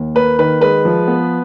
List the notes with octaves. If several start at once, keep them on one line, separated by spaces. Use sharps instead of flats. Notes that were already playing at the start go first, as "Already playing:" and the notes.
Already playing: D#2
A#3 B4
D#3 B4
G#3 B4
F3
B3